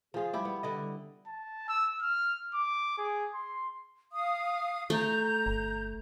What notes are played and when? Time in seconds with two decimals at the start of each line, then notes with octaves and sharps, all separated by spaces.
0.14 F3 F4 G#4
0.33 G3 E4 G4
0.45 B3
0.63 D3 E4 D#5
1.27 A5
1.69 E6
2.01 F6
2.54 D6
2.98 G#4
3.34 C6
4.12 F5 D#6
4.90 A3 A#5 G6
5.46 G1